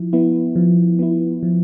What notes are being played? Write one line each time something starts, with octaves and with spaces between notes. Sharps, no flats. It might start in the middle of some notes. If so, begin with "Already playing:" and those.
Already playing: F3 E4
B3 E4
F3
B3 E4
F3